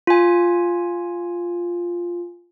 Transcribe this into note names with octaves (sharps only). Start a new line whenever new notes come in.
F4 G#5